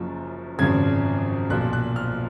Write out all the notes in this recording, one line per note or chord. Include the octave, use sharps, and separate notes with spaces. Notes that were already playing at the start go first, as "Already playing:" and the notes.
Already playing: F#1 F#2 F3
G#1 F#2 C#3 F3 G#6
B1 A#2 F3 F#6
F#6
F6